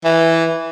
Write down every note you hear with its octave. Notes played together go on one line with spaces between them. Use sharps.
E3